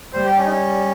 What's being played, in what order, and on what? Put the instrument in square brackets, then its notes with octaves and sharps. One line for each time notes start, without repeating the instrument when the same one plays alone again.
[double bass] G3 [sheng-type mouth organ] C5
[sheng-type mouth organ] G4
C#4
D#4
C#4